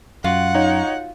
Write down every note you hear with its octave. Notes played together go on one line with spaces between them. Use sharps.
F#2 F4 F#4 F5 F#5
D#4 C#5